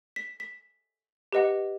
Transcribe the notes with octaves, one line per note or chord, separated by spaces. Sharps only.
B6
B6
G4 B4 D#5 F#5